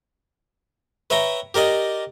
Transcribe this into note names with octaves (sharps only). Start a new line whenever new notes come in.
B4 C#5 E5 G5 A#5
G4 A#4 D5 D#5